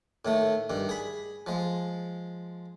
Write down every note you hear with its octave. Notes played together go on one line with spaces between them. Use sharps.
A2 D#3 A3
G2 D#3
G#4 B5
F3 G#3